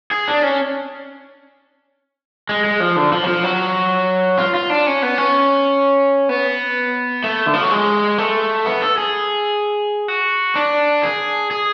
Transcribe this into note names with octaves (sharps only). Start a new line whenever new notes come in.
G#4
D4
C#4
G#3
G#3
F3
D3
F3
F#3
F3
F#3
F4
F4
D4
C#4
B3
C#4
B3
A3
D3
F3
F#3
G#3
A3
B3
A4
G#4
F#4
D4
G#4
G#4